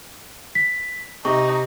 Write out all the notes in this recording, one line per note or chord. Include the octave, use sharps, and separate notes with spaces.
B6
C3 D#4 C#6